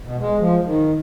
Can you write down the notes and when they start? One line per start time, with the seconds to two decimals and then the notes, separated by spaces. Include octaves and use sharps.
0.04 B2
0.19 G#3
0.39 F3
0.65 D#3